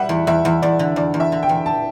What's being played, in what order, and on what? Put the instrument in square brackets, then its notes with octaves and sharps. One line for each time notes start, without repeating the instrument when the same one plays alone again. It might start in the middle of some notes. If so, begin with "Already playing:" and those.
Already playing: [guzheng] G3 [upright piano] E5 F#5
[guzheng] E2
[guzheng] E2 [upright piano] E5
[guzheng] E2
[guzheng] E2 [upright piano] D5
[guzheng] D3
[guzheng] E2 [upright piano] D5
[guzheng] E2
[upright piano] E5
[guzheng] D3
[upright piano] G5
[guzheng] E2
[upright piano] A5